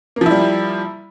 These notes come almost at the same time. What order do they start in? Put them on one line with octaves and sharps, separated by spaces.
A#3 F3 E4 G3